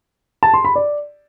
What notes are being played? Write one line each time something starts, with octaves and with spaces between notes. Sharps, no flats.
A5
C6
B5
D5